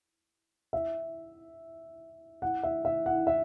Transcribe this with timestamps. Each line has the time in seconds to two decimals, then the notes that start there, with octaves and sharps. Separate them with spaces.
0.73 E5
2.42 F#5
2.63 E5
2.85 E5
3.06 F#5
3.27 E5